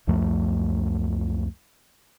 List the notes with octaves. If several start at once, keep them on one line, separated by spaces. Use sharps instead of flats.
C#2 F#2 F3 A3